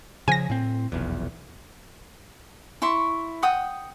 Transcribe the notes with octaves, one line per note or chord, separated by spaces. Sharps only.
C#3 F3 G#5 A#6
A2 C4
F1 B1 E2
E4 C6 C#6
F#5 G5 D#6